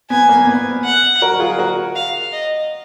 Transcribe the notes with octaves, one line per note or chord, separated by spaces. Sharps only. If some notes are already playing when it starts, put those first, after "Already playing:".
B3 G#5
A#3
B3
F#5
F#4 A#4
F4 G#4
F#4 A#4
F5
D#5